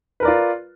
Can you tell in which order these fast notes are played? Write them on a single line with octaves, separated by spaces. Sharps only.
B4 A#4 D5 F4